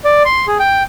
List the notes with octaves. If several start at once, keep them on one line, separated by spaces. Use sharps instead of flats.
D5
C6
G#4
G5